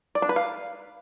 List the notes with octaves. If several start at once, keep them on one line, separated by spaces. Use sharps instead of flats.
D5
D4
B4
F5